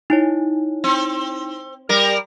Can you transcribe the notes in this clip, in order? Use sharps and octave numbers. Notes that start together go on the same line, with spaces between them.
D#4 E4 C#5
C4
G3 A#4